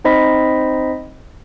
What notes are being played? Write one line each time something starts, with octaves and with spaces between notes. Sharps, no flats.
C4 D#4 C5 D#5 B5 B6